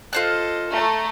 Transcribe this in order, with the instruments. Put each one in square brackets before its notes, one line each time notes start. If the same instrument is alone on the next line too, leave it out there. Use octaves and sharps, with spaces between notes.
[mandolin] F4 C5 F#6 [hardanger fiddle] A4 D#5
[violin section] A3 [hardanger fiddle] A#5